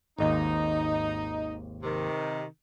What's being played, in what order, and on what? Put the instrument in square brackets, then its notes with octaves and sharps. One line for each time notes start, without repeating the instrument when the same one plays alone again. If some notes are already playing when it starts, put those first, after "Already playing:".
[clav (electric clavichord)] G#1 D#2 [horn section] D#4
[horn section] C3 D#3